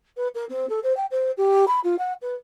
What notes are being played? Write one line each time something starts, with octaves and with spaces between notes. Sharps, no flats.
B4
A#4
C4
A4
C5
G5
C5
G4
B5
F4
F#5
B4